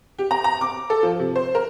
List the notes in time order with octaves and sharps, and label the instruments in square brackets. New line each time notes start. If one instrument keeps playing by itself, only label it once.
[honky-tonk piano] G4
A#5
A#5
D6
A4
F3
C3
C5
A#4